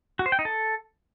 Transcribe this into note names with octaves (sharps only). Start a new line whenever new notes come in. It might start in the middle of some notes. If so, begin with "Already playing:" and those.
F#4
C5
G5
D#4
A4